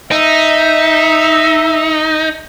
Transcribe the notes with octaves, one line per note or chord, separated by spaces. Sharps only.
D#4 E5